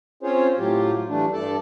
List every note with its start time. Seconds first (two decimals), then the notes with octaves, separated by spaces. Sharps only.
0.23 C4 C#4 F4 G#4 C5 C#5
0.58 A2 F#3 F4 G4
1.09 E3 G3 A3 D4
1.33 G2 A4 D5 A5